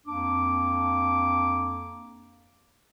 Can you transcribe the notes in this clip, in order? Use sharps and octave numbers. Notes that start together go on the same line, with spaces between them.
F2 A#3 D4 D6